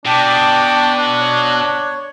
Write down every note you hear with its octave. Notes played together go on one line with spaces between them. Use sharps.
B2 D4 G5 A5 D6
C#5